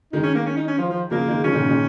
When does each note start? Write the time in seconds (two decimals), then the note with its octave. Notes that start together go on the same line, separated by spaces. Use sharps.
0.12 D#3 G#3 D#4
0.23 C#4
0.35 A#3
0.45 C#4
0.57 D#4
0.67 C#4
0.78 F3
0.90 F3
1.11 C#3 F3 A#3
1.27 D#3 G#3
1.44 C#3 F3 C#4
1.53 A#2 D#3
1.61 G#2 C#3
1.68 A#2 D#3